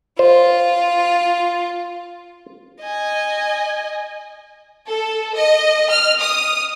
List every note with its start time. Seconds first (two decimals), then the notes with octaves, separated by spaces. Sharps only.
0.19 F4 C5
2.82 D#5 G#5
4.87 A4
5.35 D#5
5.90 F6
6.20 D#6